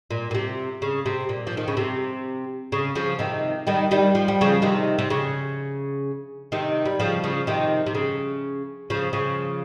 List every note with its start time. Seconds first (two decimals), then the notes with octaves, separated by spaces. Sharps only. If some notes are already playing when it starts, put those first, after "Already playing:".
0.11 A#2
0.31 A#2
0.35 C3
0.82 C#3
1.06 C3
1.29 A#2
1.47 F3
1.57 D#3
1.68 C#3
1.77 C3
2.72 C#3
2.95 C#3 F3
3.19 C3 D#3
3.67 D#3 G3
3.91 D#3 G3
4.15 F3
4.28 G3
4.41 C#3 F3
4.62 C3 D#3
4.99 C3
5.10 C#3
6.52 C3 D#3
6.85 G3
7.00 C#3 F3
7.24 C#3 F3
7.47 C3 D#3
7.86 C3
7.95 C#3
8.90 C#3 F3
9.13 C#3 F3